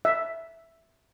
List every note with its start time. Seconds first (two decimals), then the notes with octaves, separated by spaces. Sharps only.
0.05 E5